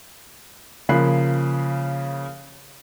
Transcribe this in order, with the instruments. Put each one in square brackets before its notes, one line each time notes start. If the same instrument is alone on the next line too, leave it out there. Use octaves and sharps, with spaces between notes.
[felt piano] C#3 F3 A#3 B5 F#6 C7